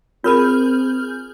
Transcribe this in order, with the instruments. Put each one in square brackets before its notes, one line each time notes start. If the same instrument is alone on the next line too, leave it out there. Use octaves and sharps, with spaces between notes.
[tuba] C4 [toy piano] F4 A#4 B5 [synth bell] G#4 F6 G6